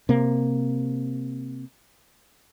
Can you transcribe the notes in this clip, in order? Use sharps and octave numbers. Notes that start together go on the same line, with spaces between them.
C3 A#3